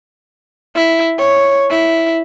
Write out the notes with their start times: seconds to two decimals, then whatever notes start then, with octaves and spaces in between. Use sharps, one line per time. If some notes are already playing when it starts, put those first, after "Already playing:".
0.76 E4
1.19 C#5
1.71 E4